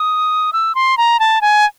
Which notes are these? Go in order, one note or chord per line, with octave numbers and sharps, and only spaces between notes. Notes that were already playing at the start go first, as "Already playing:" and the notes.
Already playing: D#6
E6
C6
A#5
A5
G#5